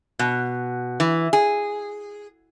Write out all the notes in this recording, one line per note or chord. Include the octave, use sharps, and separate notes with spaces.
B2
E3
G#4